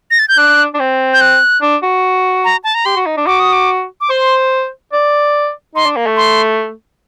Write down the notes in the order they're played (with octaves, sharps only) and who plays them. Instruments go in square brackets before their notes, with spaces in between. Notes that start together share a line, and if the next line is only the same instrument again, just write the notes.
[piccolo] A#6
A6
G6
[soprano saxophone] D4 [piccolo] F#6
[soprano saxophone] D4
C4
[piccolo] G6
F#6
[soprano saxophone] D4
F#4
[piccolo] A#5
A5
A#5
[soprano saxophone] G4 [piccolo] C6
[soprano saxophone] F#4
D#4
D4
[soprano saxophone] F#4 [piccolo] D6
[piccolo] D#6
D6
D6
[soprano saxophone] C5 [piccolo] C6
[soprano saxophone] D5
[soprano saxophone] D#4 [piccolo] C6
[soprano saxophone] D4
A#3
A3
[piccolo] C6